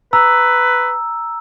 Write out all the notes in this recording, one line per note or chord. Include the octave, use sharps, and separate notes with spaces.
B4 A#5 E6